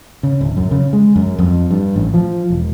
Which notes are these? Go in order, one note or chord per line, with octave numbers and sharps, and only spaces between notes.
C#3
D1
F#2
C#3
G#3
F#2
F2
G2
A1
F3
E1